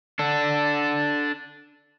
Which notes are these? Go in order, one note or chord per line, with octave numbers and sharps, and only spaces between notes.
D4 A4